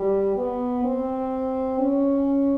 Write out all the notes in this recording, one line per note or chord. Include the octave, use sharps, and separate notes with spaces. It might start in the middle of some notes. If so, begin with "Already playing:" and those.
Already playing: G3
B3
C4
C#4